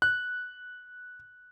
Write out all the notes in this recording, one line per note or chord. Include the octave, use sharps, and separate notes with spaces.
F#6